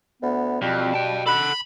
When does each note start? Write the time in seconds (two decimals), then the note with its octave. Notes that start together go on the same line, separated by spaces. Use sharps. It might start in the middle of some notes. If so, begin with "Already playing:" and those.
0.22 D2 B3
0.62 F2 B2 G3
0.94 G5 A5
1.26 A4 F#5 B5